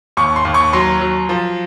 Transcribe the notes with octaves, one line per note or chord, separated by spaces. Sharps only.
D#2 C#6
C6
D#2
C#6
F#3 C6
F#3
F3